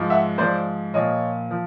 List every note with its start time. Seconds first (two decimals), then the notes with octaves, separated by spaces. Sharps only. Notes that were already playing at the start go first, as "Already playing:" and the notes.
Already playing: G#2 F3
0.10 E5 F#5
0.38 G#2 F3 C5 D5
0.94 A#2 F3 C#5 D#5
1.51 F3